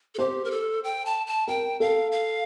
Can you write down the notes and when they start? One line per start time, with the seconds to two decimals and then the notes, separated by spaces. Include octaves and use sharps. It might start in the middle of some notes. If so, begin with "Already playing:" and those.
0.15 A4
0.19 G4 C5
0.44 A#4
0.51 A4
0.84 G5
1.06 A5
1.27 A5
1.48 A#4 G5
1.80 A4 F5
2.12 F5